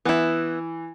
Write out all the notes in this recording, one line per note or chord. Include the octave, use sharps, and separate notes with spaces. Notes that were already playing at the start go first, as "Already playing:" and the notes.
E3 B3 E4